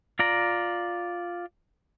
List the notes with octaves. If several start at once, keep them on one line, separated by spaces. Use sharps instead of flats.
F4 D5 A#5